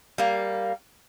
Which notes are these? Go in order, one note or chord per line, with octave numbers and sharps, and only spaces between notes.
G3 A#3